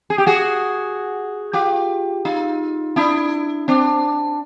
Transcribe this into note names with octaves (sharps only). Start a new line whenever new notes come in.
G#4
G4
F#4 G#4
F4 G4
D#4 F4
D4 E4
C4 D4